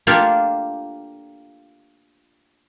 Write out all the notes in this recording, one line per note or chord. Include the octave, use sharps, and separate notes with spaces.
A#3 D4 F4 G4 A4